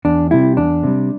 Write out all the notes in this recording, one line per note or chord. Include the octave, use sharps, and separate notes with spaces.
E2 D4
C3 G3 E4
E2 D4
C3 G3